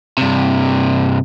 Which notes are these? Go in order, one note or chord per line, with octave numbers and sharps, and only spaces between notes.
G2 C3